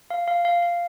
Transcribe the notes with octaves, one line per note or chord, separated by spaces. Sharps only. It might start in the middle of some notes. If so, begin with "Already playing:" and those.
F5
F5
F5
F5